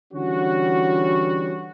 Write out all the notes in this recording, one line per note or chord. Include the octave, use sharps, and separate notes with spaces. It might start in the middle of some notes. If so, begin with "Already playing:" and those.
D3 E3 G3 C#4 F#4